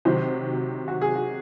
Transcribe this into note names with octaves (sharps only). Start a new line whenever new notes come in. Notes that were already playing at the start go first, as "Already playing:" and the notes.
C3 D#3 F#3 C5
F#4
G#4
F#4